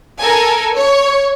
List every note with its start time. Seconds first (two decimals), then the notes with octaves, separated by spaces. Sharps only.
0.20 A4 A#4 G#5
0.73 C#5